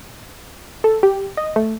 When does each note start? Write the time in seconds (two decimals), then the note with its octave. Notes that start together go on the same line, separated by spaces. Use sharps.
0.84 A4
1.03 G4
1.37 D#5
1.56 A3